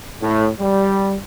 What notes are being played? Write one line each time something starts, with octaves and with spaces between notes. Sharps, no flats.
A2
G3